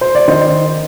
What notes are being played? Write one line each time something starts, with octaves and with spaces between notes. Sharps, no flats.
C5
D5
D#3 C5 D#5